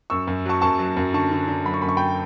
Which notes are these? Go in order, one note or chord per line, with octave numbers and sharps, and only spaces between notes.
F#2 C#6 E6
F#2
F#3 A5 C#6
F#2 A5 C#6
F#3
F#2
D3 A5 C#6
D3
D3
F#3 B5
C#6
F#2 B5
C#6
G5 B5